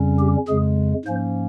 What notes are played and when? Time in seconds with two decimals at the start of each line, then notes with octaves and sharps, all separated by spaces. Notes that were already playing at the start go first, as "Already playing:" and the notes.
Already playing: F2 C#3 G3 C#4
0.19 G4
0.48 F2 C#3 G#3 G#4
1.05 G#2 F3 A#3 C#4 C5